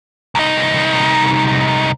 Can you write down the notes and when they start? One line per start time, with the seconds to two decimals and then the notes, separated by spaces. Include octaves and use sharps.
0.35 C2 D#4